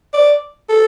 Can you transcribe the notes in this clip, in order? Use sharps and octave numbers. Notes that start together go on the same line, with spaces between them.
D5
A4